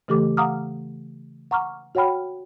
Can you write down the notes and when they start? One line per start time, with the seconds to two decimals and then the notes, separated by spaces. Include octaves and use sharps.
0.08 C#3 E3 A3 G4 A4 D6
0.37 F5 F#5 A#5 D6 D#6 F6
1.51 F#5 A#5 C#6 D6 F6
1.95 F#4 C#5 F#5 G5 B5 F6